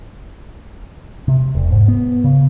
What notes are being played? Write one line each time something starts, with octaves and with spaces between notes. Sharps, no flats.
C3
E1
G#2
B3
C#3